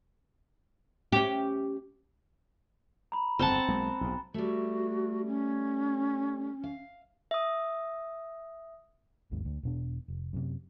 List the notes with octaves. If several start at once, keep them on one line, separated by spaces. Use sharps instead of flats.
C#4 G4
A#5 B5
G1 F2 G#2 C4 F#5 A5
B1 G#3 A#3
B1 G#2
G3 A3 F#4
C#4
F5
E5 D#6
G#1 D#2 G#2
D2
E1 B2 D4
F1
F#2 A2 C3